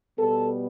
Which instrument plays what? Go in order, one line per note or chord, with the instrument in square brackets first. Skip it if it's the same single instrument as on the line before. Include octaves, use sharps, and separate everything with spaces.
[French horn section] B2 G3 B3 A4